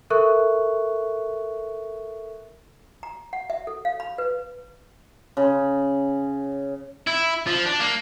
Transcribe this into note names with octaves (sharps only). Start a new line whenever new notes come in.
A4 A#4 E5 C#6 F#6
A#5
F#5
E5
A4
F5
B5
B4
C#3
E4
F3
D4
A#3